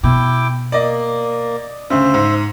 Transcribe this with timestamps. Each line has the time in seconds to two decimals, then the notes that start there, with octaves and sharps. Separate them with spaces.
0.04 B2 E4 G5 D6
0.72 A#3 D5 D#5
1.90 D2 C#3 C5 E5
2.14 G#2